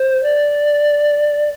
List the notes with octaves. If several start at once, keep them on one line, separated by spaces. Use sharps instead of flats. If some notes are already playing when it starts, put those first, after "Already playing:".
Already playing: C5
D5